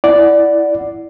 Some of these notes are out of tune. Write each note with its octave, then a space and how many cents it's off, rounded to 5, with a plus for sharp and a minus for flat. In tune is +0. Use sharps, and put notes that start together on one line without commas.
E4 +0 D5 +0 F#5 +0